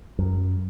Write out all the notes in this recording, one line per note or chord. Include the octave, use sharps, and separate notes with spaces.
F#2